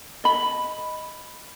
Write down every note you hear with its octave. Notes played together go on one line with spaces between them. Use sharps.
D#5 B5